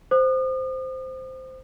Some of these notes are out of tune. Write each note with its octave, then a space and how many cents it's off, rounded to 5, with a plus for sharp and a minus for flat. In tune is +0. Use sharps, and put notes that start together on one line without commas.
C5 -10 D#6 -40